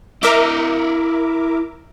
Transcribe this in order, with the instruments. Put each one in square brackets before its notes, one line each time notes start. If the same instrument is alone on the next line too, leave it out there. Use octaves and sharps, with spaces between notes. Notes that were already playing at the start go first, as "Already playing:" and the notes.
[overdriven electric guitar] E4 D#5 [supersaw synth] A#4 E5 D6